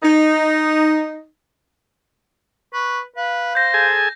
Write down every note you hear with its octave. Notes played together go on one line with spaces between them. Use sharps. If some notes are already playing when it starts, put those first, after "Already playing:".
D#4
B4 C#6
B4 F5
C5 G6 A#6
G#4 A4 G#5